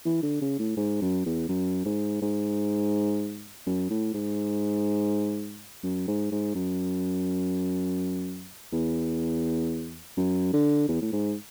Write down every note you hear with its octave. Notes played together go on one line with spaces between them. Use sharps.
E3
D3
C#3
A2
G#2
F#2
E2
F#2
G#2
G#2
F#2
A2
G#2
F#2
G#2
G#2
F#2
E2
F#2
D3
E2
A2
G#2